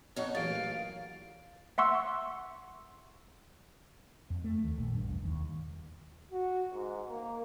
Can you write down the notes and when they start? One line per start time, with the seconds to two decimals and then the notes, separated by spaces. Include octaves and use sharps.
0.16 F2 D#4 C#5 F#5
0.35 A1 F#2 A#2 G#4 F5 A6 D7
1.78 E5 F#5 C6 C#6 E6
4.30 F2
4.44 A3
4.64 D#2
4.78 A#1
4.95 G2
5.09 E1
5.25 D#2
6.31 F#4
6.73 G#2
7.09 A#3